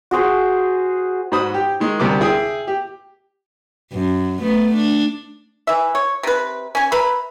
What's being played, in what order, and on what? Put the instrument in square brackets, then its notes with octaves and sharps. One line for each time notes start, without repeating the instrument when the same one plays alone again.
[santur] F#4 G#4 C5 G#5
[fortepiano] G#2 F#4 C5 B5 D#6
G4
D#3 G#3
D2 C3 G3 A#4 D6
E4 G#4 G5 D#6
G4
[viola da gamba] F#2
A3 B3
D4
[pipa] E3 E5
C#5
C3 B4
C#4 G#5
B4 E5 A#5 B5